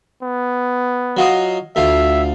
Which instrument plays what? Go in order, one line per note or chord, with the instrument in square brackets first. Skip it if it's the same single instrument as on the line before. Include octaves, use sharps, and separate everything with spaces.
[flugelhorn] B3
[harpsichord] F#3 F4 D#5
[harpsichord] D2 F4 [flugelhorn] E5